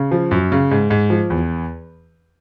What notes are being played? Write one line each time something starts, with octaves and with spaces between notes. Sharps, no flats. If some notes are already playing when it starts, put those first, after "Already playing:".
Already playing: C#3
F3
F#2
C#3
G#2
G#2
F3
E2